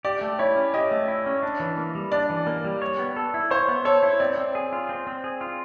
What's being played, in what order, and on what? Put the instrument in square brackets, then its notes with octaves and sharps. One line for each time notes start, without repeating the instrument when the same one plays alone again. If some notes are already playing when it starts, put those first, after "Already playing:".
[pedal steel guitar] G4 [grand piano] D5
[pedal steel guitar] A3
[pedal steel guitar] E4 [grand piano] C#5
[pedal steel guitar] C#4
[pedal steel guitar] G4 [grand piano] D#5
[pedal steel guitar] A3
E4
C#4
D4
E3
A#3
G3
[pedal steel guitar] D4 [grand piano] D5
[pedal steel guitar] E3
A#3
G3
C#5
B3
A4
E4
[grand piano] C5 [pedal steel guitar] C#5
[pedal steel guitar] B3
[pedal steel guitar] A4 [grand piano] C#5
[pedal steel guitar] E4
[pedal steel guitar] C4 [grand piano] D5
[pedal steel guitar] C4
G#4
F4
C4
C4
G#4
F4